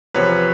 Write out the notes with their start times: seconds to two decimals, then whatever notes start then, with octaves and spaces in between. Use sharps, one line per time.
0.14 E2 C3 F3 B4 C#5